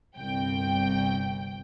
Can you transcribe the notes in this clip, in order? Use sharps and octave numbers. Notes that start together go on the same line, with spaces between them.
G1 C2 G5